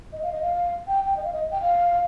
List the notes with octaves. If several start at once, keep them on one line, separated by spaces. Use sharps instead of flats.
D#5
F5
D#5
F5
G5
G5
D#5
F5
D#5
G5
F5